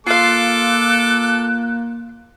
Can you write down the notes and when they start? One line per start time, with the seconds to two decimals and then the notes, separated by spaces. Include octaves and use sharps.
0.07 A#3 F4 A4 F5 D6 F#6